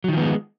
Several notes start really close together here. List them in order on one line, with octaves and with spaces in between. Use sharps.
F#3 D#3 F3 B3 G#3